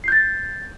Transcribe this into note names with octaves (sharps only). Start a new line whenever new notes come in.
G6 A6 C7